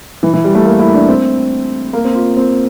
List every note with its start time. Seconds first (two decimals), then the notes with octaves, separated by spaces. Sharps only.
0.23 E3
0.34 E3
0.44 G3
0.55 A3
0.65 A#3
0.79 E4
0.94 D4
1.08 C4
1.93 A#3
2.04 C4
2.15 F4
2.37 C4